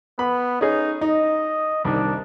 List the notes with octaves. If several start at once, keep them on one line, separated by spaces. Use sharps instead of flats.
B3 B5
C#4 D#4 G#4
D#4 D#5
C2 D#3 D4